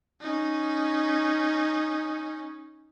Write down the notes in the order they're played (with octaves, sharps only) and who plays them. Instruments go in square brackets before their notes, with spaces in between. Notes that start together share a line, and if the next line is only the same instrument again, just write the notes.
[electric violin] C#4 D#4